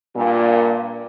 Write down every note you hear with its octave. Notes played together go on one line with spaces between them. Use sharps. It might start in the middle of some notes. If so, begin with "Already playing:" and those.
G2 A#2